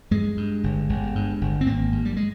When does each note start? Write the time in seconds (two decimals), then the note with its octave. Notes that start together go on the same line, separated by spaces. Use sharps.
0.11 G2 G#3
0.37 G2
0.64 G1
0.89 G1
1.15 G2
1.41 G1
1.61 C4
1.66 G#1 A#3
1.92 G2
2.05 G3
2.17 G#3